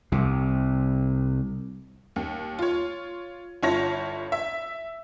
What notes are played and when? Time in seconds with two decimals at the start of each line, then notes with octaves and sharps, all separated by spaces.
0.12 C2 C3
2.16 D#2
2.59 F4 C#5
3.63 G1 E4 F4 C#5 A5 A#6
4.32 E5